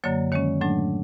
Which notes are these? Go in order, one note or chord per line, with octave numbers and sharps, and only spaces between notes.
F#2 D3 F#3 A#3 C#5
D#3 G#3 C#4 C#5
A2 F#3 A3 D4